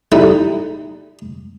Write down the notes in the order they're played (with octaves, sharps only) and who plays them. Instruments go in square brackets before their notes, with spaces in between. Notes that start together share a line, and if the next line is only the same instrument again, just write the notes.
[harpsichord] G3 A3 D#4 E4